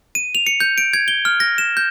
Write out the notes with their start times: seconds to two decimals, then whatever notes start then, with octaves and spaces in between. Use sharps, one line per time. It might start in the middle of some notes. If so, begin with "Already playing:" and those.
0.15 D#7
0.35 F7
0.47 C#7
0.60 G6
0.78 D7
0.93 G#6
1.08 G7
1.25 F6
1.40 A#6
1.58 E7
1.77 G6